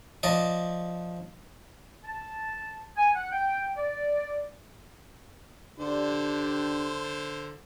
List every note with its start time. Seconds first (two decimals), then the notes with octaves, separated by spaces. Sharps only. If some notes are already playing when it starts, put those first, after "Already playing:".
0.23 F3 D5 D#5
2.04 A5
2.96 G#5
3.15 F#5
3.32 G5
3.77 D5
5.79 D3 D4 G4 C5